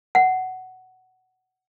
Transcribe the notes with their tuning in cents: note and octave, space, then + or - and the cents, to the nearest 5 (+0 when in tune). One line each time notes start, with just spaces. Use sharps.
F#5 +10